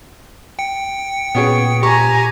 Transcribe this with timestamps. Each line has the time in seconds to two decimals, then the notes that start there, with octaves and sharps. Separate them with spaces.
0.59 G5 C#7
1.35 A#2 B3 C#4 G#4
1.83 G4 G#5 A#5 C#6